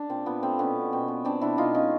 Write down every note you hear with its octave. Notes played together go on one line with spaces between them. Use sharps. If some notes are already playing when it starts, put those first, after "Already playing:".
Already playing: D4
A#2 C4
A#2 B3
A3 C4
B2 B3 C#4
B2
B2 C4
B3
B3 C4 D4
B2 D4 E4
B2 D#4 F4
G#3 C#4 D#4